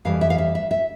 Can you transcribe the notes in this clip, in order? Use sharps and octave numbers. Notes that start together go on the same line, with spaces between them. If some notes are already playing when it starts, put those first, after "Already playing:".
F2 E3 G3 F5
E5
F5
E5
E5
E5